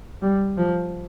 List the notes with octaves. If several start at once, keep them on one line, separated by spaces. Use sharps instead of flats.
G3
F3